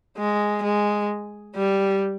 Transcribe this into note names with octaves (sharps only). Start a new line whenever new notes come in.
G#3
G#3
G3